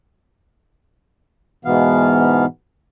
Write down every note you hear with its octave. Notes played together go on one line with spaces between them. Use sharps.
G#2 B2 E3 B3 F5